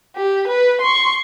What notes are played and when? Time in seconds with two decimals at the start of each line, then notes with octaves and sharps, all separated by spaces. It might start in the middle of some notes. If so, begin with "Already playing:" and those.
0.16 G4
0.48 B4
0.81 C6 C#6